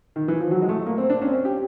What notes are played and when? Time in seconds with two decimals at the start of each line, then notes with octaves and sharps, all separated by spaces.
0.16 D#3
0.28 E3
0.40 F3
0.51 F#3
0.62 G#3
0.69 A3
0.86 A#3
0.98 C4
1.10 D4
1.22 C#4
1.27 C4
1.34 C#4
1.45 G4